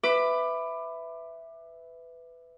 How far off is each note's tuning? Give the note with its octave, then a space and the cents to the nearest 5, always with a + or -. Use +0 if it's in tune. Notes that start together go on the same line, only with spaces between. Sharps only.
B4 +15 E5 +0 D6 +20